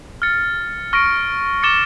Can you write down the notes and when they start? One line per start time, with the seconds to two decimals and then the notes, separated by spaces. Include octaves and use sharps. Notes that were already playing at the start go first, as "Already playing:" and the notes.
0.22 F6 A6 C#7
0.93 C#6 F6 A#6 D7
1.63 D6 A6 C#7 E7 G7